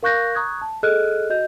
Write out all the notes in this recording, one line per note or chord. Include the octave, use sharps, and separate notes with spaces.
A#4 F5 C#6 F#6 G6 A#6
A#5 C#6 D#6 F#6 G#6
A5
G#4 A4 D#5 F6 F#6
F#4 D#5 G6